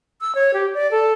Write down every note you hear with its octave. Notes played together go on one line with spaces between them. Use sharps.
E6
C#5
G4
D5
A4